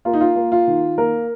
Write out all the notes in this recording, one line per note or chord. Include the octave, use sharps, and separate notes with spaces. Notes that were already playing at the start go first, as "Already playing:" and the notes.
A#3 F4
D#4
F4
A#3
F4
D#3
A#3 A#4